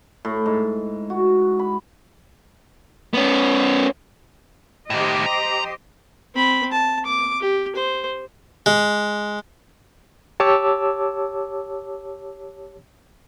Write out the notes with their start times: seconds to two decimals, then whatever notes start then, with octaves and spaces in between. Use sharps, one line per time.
0.25 A2
0.46 G#2
1.10 F#4
1.59 B5
3.14 B3 C#4
4.90 A2 D#3 G4 C5 D#5
5.26 A#5
6.35 C4 B5
6.72 A5
7.06 D6
7.41 G4
7.76 C5
8.66 G#3
10.40 G4 C#5 A5 D6 E6